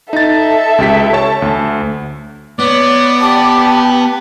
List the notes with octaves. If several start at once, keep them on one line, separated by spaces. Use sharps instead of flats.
D#4 A4 E5 A6
C#2 G4 B6
C#5 A5
D2
B3 C#5 D5
G4 A5